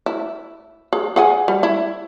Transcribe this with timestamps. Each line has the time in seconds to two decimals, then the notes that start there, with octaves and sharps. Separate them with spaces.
0.06 E4
0.93 G#4
1.16 G#4 F#5 G#5
1.48 G3
1.63 E4